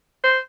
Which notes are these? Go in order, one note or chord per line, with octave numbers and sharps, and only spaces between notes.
C5